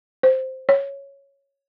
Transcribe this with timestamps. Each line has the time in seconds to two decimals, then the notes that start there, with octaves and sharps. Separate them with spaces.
0.23 C5
0.69 C#5